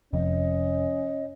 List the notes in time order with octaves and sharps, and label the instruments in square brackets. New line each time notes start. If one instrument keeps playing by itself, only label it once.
[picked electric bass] F1 F2 [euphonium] C#4 [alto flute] D#5